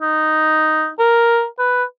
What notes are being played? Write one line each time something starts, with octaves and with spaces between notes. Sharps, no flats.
D#4
A#4
B4